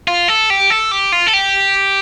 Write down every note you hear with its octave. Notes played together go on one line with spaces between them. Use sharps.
F4
A4
G4
A4
G4
F4
A4
G4